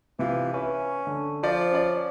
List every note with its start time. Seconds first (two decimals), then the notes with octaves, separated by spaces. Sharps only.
0.19 C3 E3 F4
0.54 C#4 B4 E5
1.07 D3
1.43 F3 C5 D5
1.71 C#4 D5